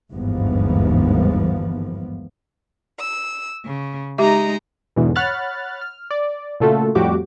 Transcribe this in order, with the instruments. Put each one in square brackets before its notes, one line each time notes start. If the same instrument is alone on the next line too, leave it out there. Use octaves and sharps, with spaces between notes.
[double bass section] G1 D#2 G#2 E3 F3 B3
[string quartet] E6
C#3
[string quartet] G#3 D#4 A#5 [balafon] G4 E5
[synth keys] E2 G#2 B2 D3 E3
C#5 F#5 B5 F6 F#6 A6
F6
D5
A#2 C#3 A3 F4 F#4 A4
F2 A2 G3 F#4 G4 D6